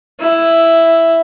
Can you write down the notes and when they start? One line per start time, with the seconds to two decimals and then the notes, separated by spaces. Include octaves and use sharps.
0.20 E4